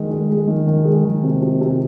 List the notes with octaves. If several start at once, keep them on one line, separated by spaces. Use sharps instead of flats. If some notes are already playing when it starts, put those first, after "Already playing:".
Already playing: D#3 G#3
G#3
G#3
D#3
D#3
G#3
D#3
C3
C3
C3